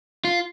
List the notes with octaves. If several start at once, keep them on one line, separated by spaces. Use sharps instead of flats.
F4